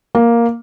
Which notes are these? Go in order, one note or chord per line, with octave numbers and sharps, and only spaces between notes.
A#3